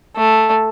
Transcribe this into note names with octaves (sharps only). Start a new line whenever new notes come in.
A3